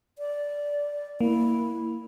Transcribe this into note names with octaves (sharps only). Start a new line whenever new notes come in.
D5
A#3 E4